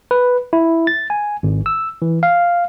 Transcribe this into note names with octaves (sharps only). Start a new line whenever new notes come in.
B4
E4
A6
G#5
G#1
E6
E3
F5